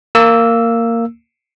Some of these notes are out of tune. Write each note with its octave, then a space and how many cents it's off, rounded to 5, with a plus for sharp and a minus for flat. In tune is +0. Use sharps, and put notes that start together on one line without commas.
A#3 -15 E6 +0